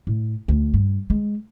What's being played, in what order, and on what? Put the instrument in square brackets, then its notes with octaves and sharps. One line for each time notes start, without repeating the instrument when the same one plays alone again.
[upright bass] A2
D2
G2
G#3